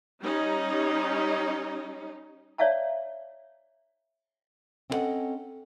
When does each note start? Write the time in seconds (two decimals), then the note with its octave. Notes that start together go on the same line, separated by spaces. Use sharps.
0.21 G3 C#4 D#4
2.58 C#5 D5 E5 F5 A5 A#5
4.90 C4 C#4 E4 A4 D#5 F#5